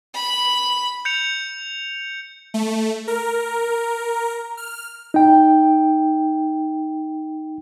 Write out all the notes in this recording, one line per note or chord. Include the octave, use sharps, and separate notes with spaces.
B5
G6 C#7 F7
A3
A#4
F6
D#4 G5